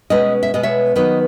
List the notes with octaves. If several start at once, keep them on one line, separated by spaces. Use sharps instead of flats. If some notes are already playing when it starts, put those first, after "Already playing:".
B2 G#3 C#4 B4 D#5
E5
B2 G#3 B3 D#5
C#5 E5
D#3 F#3 B3 B4 D#5